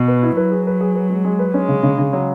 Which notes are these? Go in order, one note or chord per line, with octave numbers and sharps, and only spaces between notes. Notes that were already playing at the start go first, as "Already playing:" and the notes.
Already playing: B2
B4
E4
F#3 B4
G#4
B4
G#4
B4
G#3
G#3
B4
G#3 C#4
C#3
C#3
C#3
F#3